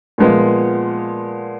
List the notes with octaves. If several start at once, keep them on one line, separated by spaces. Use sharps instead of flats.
A#2 F3 G#3 B3